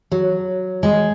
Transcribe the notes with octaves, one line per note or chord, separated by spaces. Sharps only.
F#3
G#3